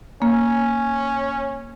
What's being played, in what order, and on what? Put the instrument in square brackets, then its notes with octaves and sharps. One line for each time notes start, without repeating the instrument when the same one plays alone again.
[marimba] A#3 [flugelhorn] C#4